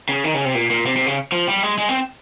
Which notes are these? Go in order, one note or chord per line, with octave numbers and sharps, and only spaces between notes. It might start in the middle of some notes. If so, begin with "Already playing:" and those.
C#3
D#3
C#3
C3
A#2
A#2
C3
C3
C#3
F3
G3
G#3
G#3
C4